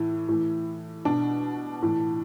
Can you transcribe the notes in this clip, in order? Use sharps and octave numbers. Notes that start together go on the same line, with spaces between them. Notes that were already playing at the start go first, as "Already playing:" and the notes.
Already playing: A2 E3 E4
A2 E3
B2 D4
A2 E3